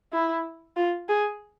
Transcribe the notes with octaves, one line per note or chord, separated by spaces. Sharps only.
E4
F4
G#4